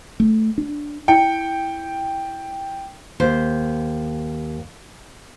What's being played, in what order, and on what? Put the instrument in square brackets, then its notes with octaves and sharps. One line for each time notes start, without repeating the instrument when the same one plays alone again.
[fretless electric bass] A3
D4
[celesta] E4 C#7 [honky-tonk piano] G5
[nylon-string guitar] D#2 C5